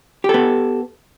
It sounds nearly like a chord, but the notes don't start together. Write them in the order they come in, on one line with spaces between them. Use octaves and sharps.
G4 A4 B3